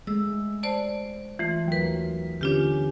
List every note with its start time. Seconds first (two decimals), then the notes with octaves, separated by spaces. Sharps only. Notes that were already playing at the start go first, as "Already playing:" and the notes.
0.07 G#3 A3 E6
0.63 C5 D5 A5
1.39 E3 A3 F4
1.68 D#2 F#3 A#4 B4
2.41 D3 B3 C#4 D4 F4 G4